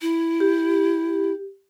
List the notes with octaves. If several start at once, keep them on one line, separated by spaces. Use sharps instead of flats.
E4
G4